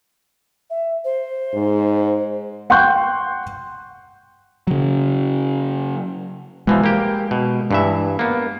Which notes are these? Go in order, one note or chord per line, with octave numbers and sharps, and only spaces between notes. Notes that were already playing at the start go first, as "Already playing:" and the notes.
E5
C5
G#2
F#5 G5 C6 C#6 F#6 G6
C#3 F#3
B2 E3 F3 G#3
A#3 G4
B2
G2 E3 E5
A#3 B3